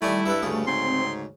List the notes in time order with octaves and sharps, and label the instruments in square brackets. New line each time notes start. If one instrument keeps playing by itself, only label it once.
[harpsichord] D#3 D5 G#5 [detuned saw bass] G3 [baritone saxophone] A3 [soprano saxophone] E4
[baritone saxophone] G2 [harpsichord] A4 B4 E5
[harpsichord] D2 C#3 G#4 [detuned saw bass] A3
[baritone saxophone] G#2 [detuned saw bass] C4 [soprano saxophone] C6